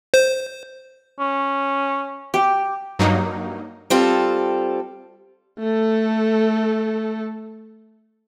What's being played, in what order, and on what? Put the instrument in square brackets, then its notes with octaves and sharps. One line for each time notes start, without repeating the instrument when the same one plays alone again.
[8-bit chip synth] C5
[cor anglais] C#4
[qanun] G4
[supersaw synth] G2 F#3 A#3 D#4
[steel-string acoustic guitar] G3 C4 F4 A4
[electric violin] A3 A4